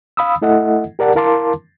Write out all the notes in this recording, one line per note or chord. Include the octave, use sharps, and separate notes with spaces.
F5 B5 D#6 E6
A3 E4 A4 D#5 E5 F#5
G4 A#4 D5 F#5 A5
E4 A#4 F5 A5 C6 D6